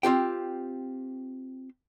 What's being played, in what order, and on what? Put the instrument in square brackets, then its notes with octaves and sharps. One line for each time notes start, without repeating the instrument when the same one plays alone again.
[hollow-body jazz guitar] C4 F4 G4 G5